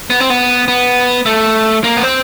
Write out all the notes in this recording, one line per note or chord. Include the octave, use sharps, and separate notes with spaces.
B3
C4
B3
B3
A3
A#3
B3
C4